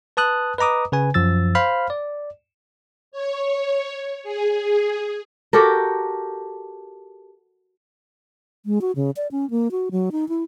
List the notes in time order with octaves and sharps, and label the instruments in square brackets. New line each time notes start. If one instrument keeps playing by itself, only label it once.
[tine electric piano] B4 A5 D#6 F#6
B4 D#5 A#5 D6 D#6
C#3 B4 G#5
F#2 F3 E6 A6
C5 F5 B5 F6
D5
[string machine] C#5
G#4
[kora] F#4 G4 A4 A#4
[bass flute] G#3
F#4
C#3
D5
C#4
A#3
F#4
F#3
D#4
E4